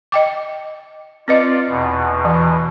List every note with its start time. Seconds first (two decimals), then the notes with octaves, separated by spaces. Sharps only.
0.12 D#5 G5 D6
1.28 C4 F4 B4 D5 D#5
1.69 E2 B2
2.25 E3